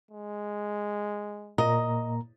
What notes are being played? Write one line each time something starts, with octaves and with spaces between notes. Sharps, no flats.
G#3
A#2 A#3 D#5 A#5